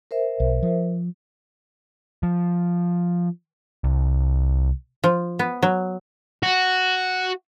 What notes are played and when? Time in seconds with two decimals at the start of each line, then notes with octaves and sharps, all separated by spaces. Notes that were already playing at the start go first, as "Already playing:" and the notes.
0.11 A#4 C5 E5
0.40 B1
0.63 F3
2.23 F3
3.84 C2
5.04 F3
5.39 B3
5.63 F#3
6.43 F#4